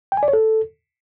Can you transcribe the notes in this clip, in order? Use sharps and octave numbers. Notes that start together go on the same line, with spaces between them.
G5
G#5
D5
C#5
A4